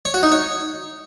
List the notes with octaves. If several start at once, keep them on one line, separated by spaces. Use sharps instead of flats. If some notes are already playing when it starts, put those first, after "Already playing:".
C#5
F#4
D#4
C#5